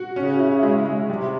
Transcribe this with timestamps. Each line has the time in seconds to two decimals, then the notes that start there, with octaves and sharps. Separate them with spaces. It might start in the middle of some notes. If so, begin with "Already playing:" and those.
Already playing: F#4
0.15 C#3 C#4
0.39 E4
0.63 G#3
0.85 G#3
1.08 C3 G3